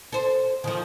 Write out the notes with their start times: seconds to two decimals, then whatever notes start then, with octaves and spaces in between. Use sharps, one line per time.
0.12 A4 C5
0.64 D#3 F3